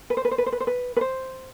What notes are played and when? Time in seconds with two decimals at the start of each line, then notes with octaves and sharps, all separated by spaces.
0.10 B4
0.17 C5
0.25 B4
0.31 C5
0.38 B4
0.46 C5
0.52 B4
0.60 C5
0.67 B4
0.96 B4
1.01 C5